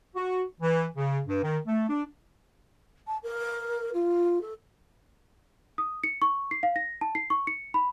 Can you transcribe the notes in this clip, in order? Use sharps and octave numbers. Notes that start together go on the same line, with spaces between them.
F#4
E3
C#3
G2
D#3
A3
D4
A5
A#4
F4
A4
D#6
C#7
C#6
C7
F5
A#6
A5
C7
C#6
C#7
B5